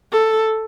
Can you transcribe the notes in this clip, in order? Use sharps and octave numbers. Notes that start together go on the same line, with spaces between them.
A4